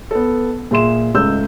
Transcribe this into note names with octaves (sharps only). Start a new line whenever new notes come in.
B3 A4
A#2 G#4 E5 C6 E7
C#2 G#2 A3 E6 G6